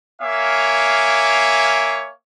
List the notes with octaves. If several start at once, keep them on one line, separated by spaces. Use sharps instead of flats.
A#3 C#5 E5 F5 G#5 D6